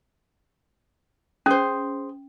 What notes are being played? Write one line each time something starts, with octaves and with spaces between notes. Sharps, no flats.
C#4 G#4 C5